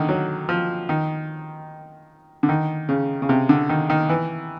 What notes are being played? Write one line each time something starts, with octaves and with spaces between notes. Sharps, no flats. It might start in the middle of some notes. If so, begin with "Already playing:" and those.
Already playing: D3 D#3
F#3
F3
D#3
D3
D#3
C#3
C#3
C3
D3
D#3
D#3
E3